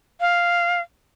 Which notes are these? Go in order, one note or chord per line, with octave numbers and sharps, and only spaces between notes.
F5